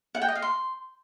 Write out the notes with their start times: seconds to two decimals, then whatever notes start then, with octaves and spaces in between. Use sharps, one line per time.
0.15 F#5
0.22 G5
0.28 D#5
0.35 F5
0.42 C6